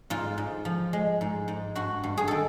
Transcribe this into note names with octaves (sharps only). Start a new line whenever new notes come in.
G#2 F4
G#2
F3
G#3
G#2
G#2
G2 F#4
G2
G#4
D#3 A4